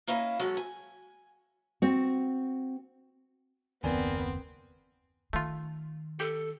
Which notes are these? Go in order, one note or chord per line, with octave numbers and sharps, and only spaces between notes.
A#3 C#4 E4 D#5 F5
F#3 G#3 C#4 A4
G#5
C4 F#4
F#1 D#2 B3 C4 A#4 D5 G#5
D#3 A3 F4
G4 A4